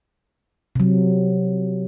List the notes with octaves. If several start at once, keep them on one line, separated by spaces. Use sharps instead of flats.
C3 F#3